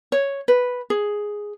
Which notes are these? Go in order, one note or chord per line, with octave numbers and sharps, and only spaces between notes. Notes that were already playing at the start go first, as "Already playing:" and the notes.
C#5
B4
G#4